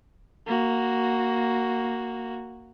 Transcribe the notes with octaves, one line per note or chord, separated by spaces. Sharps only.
A#3 F#4